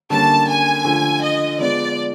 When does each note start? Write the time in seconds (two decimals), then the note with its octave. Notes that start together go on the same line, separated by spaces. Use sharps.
0.10 D3 G3 A#3 C#4 A5
0.48 G#5
0.85 D3 F3 A3
1.22 D#5
1.59 F3 G#3 B3 D5